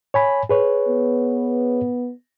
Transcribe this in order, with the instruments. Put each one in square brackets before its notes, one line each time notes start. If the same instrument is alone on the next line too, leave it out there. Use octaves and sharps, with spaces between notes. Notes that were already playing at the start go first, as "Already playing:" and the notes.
[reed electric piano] C#5 G#5 B5
G#4 B4 C#5
[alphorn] B3